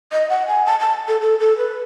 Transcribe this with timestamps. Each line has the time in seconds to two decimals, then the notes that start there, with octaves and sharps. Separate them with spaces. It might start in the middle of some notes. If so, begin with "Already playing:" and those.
0.12 D#5
0.30 F#5
0.48 G#5
0.66 A5
0.80 A5
1.08 A4
1.21 A4
1.40 A4
1.58 B4